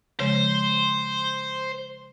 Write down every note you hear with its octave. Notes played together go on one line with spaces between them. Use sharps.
C#3 F3 G#3 C5